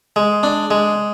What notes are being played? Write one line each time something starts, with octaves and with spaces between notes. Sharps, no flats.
G#3
D4
G#3